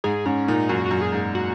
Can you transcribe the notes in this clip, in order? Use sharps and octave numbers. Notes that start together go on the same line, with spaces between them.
G#2 G#4
G#2 C#4
A#2 D#4
F#2 F#4
F#4
F#2
G#4
G#2
F#4